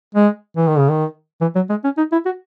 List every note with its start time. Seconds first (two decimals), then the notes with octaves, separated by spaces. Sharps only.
0.15 G#3
0.57 E3
0.68 D#3
0.78 C#3
0.89 D#3
1.41 E3
1.55 F#3
1.70 G#3
1.84 C#4
1.97 D#4
2.12 E4
2.25 F#4